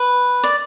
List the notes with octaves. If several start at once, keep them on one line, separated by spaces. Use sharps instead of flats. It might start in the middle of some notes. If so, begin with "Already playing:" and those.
Already playing: B4
D5